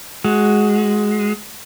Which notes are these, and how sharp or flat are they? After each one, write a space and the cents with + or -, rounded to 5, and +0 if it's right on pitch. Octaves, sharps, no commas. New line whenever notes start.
G#3 +10 F#4 +0